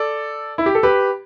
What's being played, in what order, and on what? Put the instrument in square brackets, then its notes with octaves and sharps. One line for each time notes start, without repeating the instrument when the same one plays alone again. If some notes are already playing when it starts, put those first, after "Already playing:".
Already playing: [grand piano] A4 D5
E4
G4
A4
G4 B4